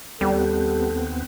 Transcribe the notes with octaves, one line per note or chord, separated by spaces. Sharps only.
D#2 G3 B3 C4 A4